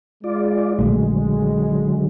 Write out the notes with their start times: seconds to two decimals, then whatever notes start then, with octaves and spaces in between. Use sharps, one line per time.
0.24 G#3 F4 D5
0.79 A#1 D3 F#3 A3